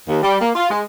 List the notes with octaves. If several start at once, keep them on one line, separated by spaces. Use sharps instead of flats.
D#2
G3
A#3
F4
G#3